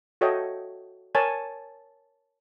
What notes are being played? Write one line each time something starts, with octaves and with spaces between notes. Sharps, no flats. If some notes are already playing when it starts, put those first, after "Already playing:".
F#4 A4 C#5 D#5 E5 G5
A#4 C#5 G#5 A5